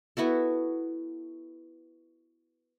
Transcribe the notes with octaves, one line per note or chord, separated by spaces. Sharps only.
B3 E4 F#4 A4